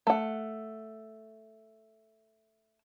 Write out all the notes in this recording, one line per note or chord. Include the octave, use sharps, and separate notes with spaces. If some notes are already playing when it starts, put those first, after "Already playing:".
A3 F#5